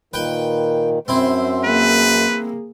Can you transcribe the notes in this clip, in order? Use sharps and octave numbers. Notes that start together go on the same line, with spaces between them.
A#2 D#3 B4 G5
F#2 C4 E4 C5
A#3 G#4 B4